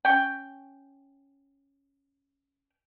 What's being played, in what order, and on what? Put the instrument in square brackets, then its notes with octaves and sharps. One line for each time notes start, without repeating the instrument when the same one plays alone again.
[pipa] C#4 G5